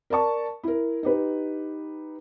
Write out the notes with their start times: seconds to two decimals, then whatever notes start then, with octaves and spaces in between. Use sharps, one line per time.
0.10 A#4 D5 A5 C#6
0.63 E4 A#4
1.03 D#4 G4 B4